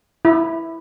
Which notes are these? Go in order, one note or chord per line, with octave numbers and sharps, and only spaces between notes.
E4